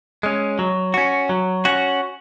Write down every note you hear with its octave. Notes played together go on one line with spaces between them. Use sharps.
G#3 C#4
F#3
C#4 F#4
F#3
C#4 F#4